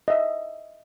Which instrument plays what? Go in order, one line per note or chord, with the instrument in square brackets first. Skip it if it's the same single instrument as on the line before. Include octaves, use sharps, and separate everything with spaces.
[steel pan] D#5 E5